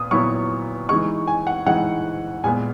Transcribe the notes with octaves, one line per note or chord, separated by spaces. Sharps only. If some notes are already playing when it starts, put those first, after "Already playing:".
Already playing: A#2 B3 D#6
A#2 F#3 B3 E4 C#6
E3 G#3 D#4 C#6
G#5
F#5
E3 G#3 D#4 F#5
A#2 G#3 B3 G#5